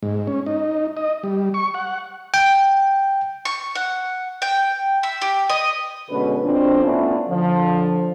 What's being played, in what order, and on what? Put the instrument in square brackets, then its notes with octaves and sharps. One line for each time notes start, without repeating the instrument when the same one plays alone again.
[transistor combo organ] G#2
C#4
D#4
D#5
G3
C#6
F#5
[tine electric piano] G5
[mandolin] C#6
F#5
G5
E5
G4
D#5
[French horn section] B2 D3 G#3 C#4 B4
F2 B2 F3 C4 D4
A2 B3 C#4 D4 E4 F4
D3 F3